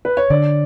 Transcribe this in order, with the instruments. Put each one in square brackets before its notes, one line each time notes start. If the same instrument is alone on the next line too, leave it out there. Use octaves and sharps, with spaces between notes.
[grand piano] B4
C#5
[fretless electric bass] D3 [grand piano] D5